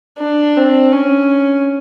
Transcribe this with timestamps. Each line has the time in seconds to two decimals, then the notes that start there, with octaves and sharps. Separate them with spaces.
0.19 D4
0.57 C4
0.92 C#4